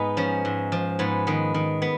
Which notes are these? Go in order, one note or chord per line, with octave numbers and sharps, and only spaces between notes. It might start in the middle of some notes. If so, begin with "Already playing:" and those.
Already playing: G#2 B3 D#4
F3 C#4
G#2
F3
G#2 B3
D#3 B3
D#3
B3